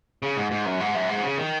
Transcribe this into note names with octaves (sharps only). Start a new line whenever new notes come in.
C#3
G#2
G#2
F#2
G#2
F#2
G#2
C#3
D#3